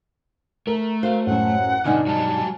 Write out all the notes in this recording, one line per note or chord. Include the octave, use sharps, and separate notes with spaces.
A3 A#4
F#4 C5 F5
A1 F#2 F#5
G2 B2 D3 D#4 G#5 F6
F#3 G3 F#4 A5